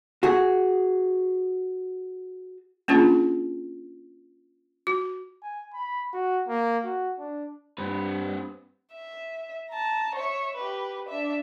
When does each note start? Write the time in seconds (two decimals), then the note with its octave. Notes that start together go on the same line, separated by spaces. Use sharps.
0.23 F#4 G#4
2.88 A#3 C#4 D4 F4 G#4
4.87 F#4
5.42 G#5
5.74 B5
6.13 F#4
6.48 A#3
6.84 F#4
7.19 D4
7.78 G2 C4 B4
8.93 E5
9.71 A5 A#5
10.15 C#5 E5
10.56 G4 B4
11.09 D4 E5